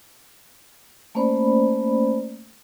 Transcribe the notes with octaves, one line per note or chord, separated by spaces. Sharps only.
A3 A#3 C#4 C5 D5 B5